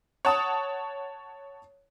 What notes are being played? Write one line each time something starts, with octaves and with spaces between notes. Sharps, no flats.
C#5 F#5 A5 D#6